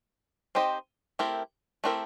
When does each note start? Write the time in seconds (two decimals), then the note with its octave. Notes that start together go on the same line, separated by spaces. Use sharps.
0.55 C4 D#4 G4 C5 D#5
1.19 A3 C4 E4 G4 A#4
1.84 A3 C4 E4 G4 A#4